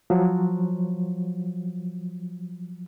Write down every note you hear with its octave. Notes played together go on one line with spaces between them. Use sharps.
F3 F#3